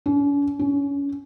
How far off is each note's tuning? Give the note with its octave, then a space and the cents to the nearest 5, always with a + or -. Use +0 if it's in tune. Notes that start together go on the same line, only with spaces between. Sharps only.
C#4 +45
C#4 +25